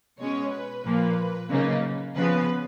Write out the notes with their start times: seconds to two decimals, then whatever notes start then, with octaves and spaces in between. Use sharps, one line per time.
0.19 B2 G#3 C#4 C#5
0.51 B4
0.84 A#2 F3 A#3
1.50 C#3 F#3 A#3 D#4
2.15 C#3 F3 B3 B4